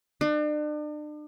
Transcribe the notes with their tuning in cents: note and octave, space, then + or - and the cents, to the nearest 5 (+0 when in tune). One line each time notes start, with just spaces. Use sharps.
D4 +40